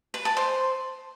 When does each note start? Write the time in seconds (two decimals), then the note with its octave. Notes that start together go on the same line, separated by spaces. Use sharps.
0.14 B4
0.25 A5
0.37 C5